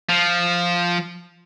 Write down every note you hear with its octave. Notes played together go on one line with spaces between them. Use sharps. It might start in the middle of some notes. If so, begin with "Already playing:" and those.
F3